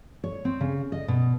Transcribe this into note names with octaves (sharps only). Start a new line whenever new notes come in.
C#5
C4
C#3
D#5
B2